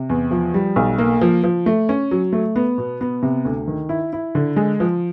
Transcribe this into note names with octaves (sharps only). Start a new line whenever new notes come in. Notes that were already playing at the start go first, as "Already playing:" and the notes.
Already playing: C3
E2
F3
G3
B1
A#3
F3
F3
A3
C#4
F#3
A3
B3
B2
B3
C3
D2
D#3
E4
E4
D3
G#3
F3